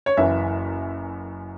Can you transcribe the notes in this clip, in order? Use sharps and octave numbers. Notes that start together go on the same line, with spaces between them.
C#5
F#1 F#2 E3 E5